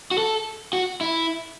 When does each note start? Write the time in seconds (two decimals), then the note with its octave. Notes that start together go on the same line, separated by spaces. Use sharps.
0.11 F#4
0.18 A4
0.73 F#4
1.01 E4